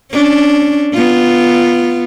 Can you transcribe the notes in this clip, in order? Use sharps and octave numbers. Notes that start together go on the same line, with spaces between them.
C#4 D4
B3 F4